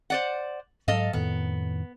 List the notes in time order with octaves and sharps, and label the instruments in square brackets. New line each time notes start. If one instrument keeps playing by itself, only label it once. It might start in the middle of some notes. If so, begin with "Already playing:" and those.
[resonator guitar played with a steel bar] C5 D5 F#5
[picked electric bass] G#2 F#3 [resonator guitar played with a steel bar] A4 D#5 F5
[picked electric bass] F2 A2 D#3 [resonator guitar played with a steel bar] B3